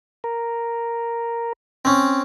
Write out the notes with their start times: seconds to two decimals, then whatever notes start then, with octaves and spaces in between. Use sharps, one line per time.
0.24 A#4
1.85 C4 C#4